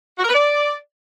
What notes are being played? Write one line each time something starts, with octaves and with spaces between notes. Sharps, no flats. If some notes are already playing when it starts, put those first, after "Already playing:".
F#4
A#4
B4
D5